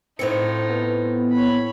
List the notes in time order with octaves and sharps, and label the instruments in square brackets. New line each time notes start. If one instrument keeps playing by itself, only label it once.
[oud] A2 C4 [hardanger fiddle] D#4 F4 [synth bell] C5 C#7
[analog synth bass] B3
[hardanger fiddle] C#5 B5